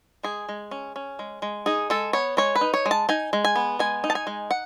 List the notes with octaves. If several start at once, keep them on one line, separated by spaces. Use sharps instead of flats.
G#3 G#4
G#3
C#4
C#4
G#3
G#3
D#4 G#4
G#3 A4
B3 C#5
G#3 C#5
B4
D#4
C#5
G#3
A5
D#4 G#5
G#3
G#5
B3
G#3 G#5
D#4
A5
G#5
G#3
F#5